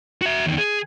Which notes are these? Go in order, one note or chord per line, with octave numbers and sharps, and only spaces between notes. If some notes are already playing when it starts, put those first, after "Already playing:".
F#4 E5
E2 D#3
G#4